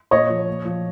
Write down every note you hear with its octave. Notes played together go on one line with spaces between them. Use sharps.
A#2 C#5 D#5
F3
A#2
F3